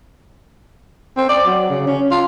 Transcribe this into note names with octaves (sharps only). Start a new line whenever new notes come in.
C4
D5
F#3
C#3
C#4
F4